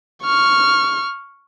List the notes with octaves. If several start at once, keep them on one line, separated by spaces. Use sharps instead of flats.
C#6 F6